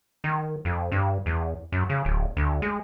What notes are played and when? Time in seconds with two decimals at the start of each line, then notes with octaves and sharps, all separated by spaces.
0.24 D#3
0.65 F2
0.92 G2
1.26 E2
1.72 F#2
1.89 C#3
2.05 D1
2.37 D2
2.62 G#3